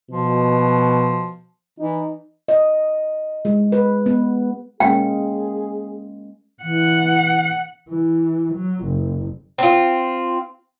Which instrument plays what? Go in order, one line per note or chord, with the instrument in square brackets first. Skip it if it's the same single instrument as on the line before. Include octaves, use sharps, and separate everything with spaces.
[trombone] B2 [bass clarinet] F3
[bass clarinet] E3 [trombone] D#4
[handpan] D#5
G#3
B4
B3
[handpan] G#3 A#3 C#4 [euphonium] G#4 [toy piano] G5
[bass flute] E3 [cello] F#5
[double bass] E3
F#3
F#1
[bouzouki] C4 F4